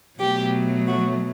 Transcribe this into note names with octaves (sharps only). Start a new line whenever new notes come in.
B2 F#3 A3 G4
F#4